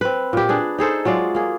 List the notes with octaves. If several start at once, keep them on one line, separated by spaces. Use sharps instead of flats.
C4 B4
A#2 G4
D4 G#4 B4
D#4 G#4 A4 C5
F#3 G#3 F4 D5
A#3 G#4